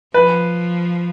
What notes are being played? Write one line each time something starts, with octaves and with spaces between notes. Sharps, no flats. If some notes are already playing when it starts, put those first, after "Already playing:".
F3 B4